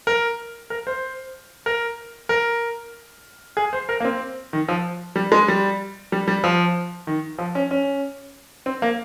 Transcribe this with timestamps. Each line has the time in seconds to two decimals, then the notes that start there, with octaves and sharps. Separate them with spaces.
0.07 A#4
0.70 A#4
0.87 C5
1.66 A#4
2.29 A#4
3.57 G#4
3.73 C5
3.89 A#4
4.00 A#3
4.05 C4
4.53 D#3
4.68 F3
5.16 G3
5.32 G#3
5.48 G3
6.12 G3
6.28 G3
6.44 F3
7.07 D#3
7.38 F3
7.55 C#4
7.71 C#4
8.66 C4
8.82 A#3